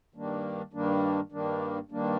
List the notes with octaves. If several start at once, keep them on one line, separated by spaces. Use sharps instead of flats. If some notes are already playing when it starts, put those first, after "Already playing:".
G2 D#3 G3 A#3 D4
G2 D#3 G3 A#3 D4
G2 D#3 G3 A#3 D4
G2 D#3 G3 A#3 D4